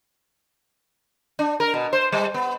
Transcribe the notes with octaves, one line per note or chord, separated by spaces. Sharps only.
D4
A#4
B2
C5
G3
B3